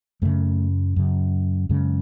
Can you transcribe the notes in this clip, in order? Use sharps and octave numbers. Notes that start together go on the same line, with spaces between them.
F#2 C#3 A3
F#2 C#3
F#2 C#3 G#3